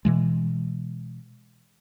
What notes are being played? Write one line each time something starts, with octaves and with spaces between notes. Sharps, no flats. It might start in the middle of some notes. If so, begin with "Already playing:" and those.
B2 E3 G#3